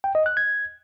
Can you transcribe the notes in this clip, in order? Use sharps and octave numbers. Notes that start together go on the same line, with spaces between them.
G5
D#5
F#6
G#6